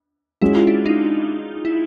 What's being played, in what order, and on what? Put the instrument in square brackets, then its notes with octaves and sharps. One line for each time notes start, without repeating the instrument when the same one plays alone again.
[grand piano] G#3 C#4 F#4 [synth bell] E4
[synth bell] F4
D4 E4
D#4 F4
E4